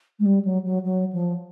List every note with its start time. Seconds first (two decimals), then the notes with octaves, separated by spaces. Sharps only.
0.19 G#3
0.25 G3
0.44 F#3
0.64 F#3
0.84 F#3
1.12 F3